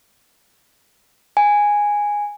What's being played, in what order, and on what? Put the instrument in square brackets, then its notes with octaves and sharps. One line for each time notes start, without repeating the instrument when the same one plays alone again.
[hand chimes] G#5